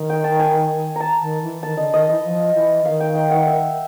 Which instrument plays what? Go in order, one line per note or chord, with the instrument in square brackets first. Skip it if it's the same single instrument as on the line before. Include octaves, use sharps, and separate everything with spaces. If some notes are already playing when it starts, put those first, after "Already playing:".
Already playing: [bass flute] D#3
[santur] G5
A5
G#5
A5 A#5
[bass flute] D#3
E3
[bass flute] D#3 [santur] A5
[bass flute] D3 [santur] D#5
[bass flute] D#3 [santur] D#5
[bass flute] E3 [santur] D#5
[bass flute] F3
E3
[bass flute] D#3 [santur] F5
[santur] G5
G5
F#5
E5